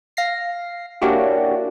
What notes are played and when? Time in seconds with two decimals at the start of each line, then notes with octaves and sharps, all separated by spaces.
0.17 F5 A#6 C7
1.01 A#3 C#4 D4 E4 F#4 G4